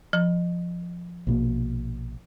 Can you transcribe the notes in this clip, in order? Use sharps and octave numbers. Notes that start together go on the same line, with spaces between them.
F3
A#1 B2 A#3